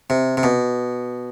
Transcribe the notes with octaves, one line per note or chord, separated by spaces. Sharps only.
C3
C3
B2